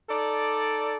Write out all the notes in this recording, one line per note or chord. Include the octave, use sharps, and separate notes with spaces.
D#4 A4 D5